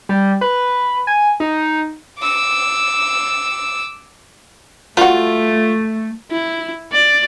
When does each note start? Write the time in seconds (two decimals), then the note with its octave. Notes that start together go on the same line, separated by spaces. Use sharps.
0.09 G3
0.41 B4
1.07 G#5
1.40 D#4
2.19 D6 E6
4.97 G3 A3 F4 F#4
6.31 E4
6.92 D5